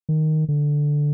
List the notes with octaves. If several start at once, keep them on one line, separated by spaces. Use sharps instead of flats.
D#3
D3